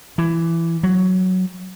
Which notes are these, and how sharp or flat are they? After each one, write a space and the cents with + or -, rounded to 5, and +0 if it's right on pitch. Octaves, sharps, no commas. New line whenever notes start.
E3 +15
F#3 +5